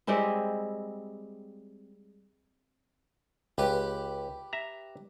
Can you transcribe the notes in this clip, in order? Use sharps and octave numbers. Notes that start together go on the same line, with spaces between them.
G3 G#3 C4 E4
C#2 G4 B4
E5 A#5